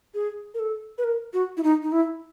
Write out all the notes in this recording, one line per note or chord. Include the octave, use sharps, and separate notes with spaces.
G#4
A#4
A4
B4
A#4
F#4
E4
D#4
D#4
E4